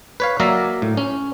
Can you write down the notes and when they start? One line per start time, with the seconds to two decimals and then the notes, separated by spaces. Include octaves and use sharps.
0.20 B4 C#5 F5
0.40 F#3 A#3 D5 E5 F5 A#5
0.82 A2
0.97 C#4